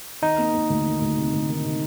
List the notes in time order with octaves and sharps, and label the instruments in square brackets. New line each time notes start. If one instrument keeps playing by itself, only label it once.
[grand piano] D#3 [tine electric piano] D#4
[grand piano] A#3
A#3
D2
D#3
D2
C3
D2
D#3
C3